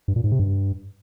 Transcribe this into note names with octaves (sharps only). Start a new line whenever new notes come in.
G2
A#2
G#2
C3
G2